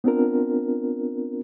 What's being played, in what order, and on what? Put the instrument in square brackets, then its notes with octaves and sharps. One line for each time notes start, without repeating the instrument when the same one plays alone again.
[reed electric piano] B3 C4 D4 F4 A#4